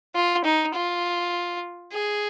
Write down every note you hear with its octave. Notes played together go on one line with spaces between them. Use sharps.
F4
D#4
F4
G#4